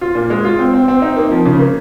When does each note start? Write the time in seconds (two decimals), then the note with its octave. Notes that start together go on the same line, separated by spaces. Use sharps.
0.01 F4
0.15 A#2
0.30 G#3
0.45 F4
0.59 C4
0.74 C4
0.88 C4
1.02 D#4
1.16 A#3
1.31 F3
1.45 C#3
1.59 A#3